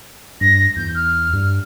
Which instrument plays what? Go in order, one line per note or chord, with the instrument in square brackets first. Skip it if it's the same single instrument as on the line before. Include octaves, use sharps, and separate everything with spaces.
[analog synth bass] G2 [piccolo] A#6
[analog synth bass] E2 [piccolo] G6
[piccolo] F6
[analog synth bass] G2